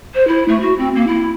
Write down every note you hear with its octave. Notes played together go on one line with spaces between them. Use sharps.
C5
E4
A3
F#4
C4
A#3
E4